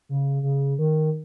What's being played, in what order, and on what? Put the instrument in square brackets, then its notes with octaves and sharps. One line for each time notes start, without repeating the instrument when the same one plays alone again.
[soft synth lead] C#3
C#3
D#3